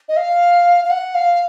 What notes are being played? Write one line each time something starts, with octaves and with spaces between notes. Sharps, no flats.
D#5
F5
F5
F#5
F5